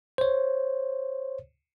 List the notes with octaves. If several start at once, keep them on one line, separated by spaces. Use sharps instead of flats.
C5 C#5